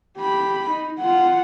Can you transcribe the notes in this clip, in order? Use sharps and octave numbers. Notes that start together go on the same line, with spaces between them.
G4 B5
D#4
F4 F#5